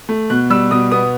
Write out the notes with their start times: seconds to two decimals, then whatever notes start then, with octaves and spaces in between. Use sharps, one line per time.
0.09 A3
0.30 B2 F#6
0.50 G3 E6
0.71 B2 D#6
0.92 B3 D#6